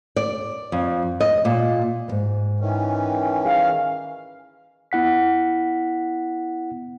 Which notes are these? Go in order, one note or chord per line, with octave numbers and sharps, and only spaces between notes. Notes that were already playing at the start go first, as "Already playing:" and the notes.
D5
F2
D#5
A#2
E2 G#2
D#3 E3 C#4
G#4 F5
B3 E4 F#5 B6